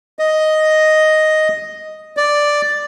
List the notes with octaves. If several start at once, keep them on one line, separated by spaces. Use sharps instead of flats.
D#5
D5